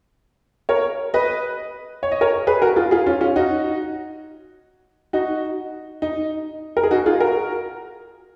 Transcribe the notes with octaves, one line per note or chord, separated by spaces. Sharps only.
A#4 C#5
B4 D#5
C#5
D#5
A#4 C#5
G#4 B4
F#4 A#4
F4 G#4
F4 G#4
C#4 F4
C#4 F4
D#4 F#4
D#4 F#4
D#4
A#4
G#4
D#4 F#4
F4 G#4
F#4 A#4